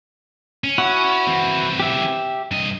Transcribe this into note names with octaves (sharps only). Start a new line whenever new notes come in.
C#4
E4 F#4 F#5
E3 C4
G4 E5
G2 D#5